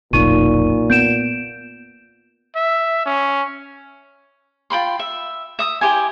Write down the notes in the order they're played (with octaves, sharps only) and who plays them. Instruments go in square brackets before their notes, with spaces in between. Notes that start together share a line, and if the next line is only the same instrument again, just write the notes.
[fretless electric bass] F1 B1 [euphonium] A#2 [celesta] D#4 C#6 D#7
[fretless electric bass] B3 [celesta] G6 D7 E7
[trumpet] E5
C#4
[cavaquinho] F4 G5 B5 C6
E5
E5 D#6
E4 G4 C5 G#5